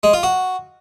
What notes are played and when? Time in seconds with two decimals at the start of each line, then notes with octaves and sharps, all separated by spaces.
0.03 G#3
0.13 F4
0.23 F#4